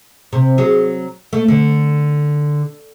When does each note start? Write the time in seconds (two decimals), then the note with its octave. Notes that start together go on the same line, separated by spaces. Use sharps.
0.33 C3
0.58 F#3 G#4
1.33 A3
1.48 D3